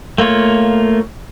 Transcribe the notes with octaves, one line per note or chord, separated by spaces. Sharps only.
A3 A#3 F4 C#5